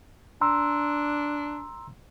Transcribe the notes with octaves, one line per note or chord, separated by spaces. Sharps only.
D4 A#5 C6 E6